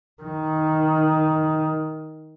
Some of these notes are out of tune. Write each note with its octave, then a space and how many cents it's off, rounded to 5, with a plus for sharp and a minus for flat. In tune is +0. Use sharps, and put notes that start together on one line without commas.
D#3 +10